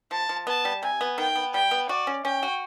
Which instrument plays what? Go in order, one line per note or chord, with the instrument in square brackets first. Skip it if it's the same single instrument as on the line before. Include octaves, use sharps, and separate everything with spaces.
[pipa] F3 [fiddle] A5
[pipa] F3
[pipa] B3 [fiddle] A5
[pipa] G3
[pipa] C3 [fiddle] G#5
[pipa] B3
[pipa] D#3 [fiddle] G5
[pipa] B3
[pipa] G3 [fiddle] G5
[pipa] B3
[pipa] F#4 [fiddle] D5
[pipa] C#4
[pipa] C#4 [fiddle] G5
[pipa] F#4